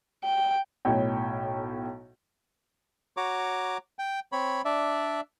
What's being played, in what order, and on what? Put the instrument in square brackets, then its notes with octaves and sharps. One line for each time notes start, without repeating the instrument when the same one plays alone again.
[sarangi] G5
[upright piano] B1 A2 C#5 G5
[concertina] F#4 C#5 A#5 D6
G5
C4 C#5 B5
D4 D5 E5